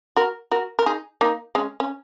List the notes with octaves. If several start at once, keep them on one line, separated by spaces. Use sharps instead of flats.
F#4 A#4
F#4 A#4
A#4
D#4 G#4
A#3 D#4
G#3 C#4
C#4